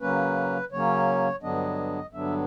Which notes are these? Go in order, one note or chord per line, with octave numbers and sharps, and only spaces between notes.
C#3 F#3 A#3 C#4 B4
C#3 F#3 A#3 C#4 C#5
G2 D3 F#3 B3 D4 D#5
G2 D3 F#3 B3 D4 E5